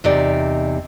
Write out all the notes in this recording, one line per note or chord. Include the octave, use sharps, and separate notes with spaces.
E2 C3 D#4 D5